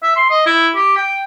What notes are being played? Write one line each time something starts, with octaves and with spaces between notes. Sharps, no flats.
E5
C6
D#5
E4
G4
G5